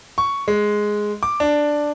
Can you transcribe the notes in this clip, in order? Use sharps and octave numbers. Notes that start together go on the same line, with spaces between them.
C#6
G#3
D6
D4